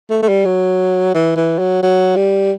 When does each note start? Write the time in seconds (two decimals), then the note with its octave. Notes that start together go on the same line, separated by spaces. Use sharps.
0.10 A3
0.22 A3
0.29 G3
0.45 F#3
1.14 E3
1.36 E3
1.59 F#3
1.83 F#3
2.16 G3